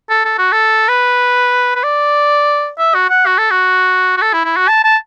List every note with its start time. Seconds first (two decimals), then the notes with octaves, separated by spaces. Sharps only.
0.10 A4
0.25 A4
0.38 F#4
0.52 A4
0.88 B4
1.75 B4
1.84 D5
2.78 E5
2.94 F#4
3.10 F#5
3.26 F#4
3.38 A4
3.51 F#4
4.17 F#4
4.22 A4
4.33 E4
4.45 E4
4.57 F#4
4.68 A5
4.84 A5